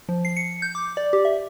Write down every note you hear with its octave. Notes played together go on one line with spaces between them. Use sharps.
F3
C7
C#7
G6
D6
D5
G4
E5